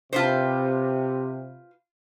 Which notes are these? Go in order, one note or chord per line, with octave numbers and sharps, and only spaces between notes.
C3 F4 B4 C5